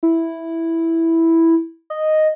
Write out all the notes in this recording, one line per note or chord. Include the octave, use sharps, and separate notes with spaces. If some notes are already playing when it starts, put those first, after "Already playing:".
E4
D#5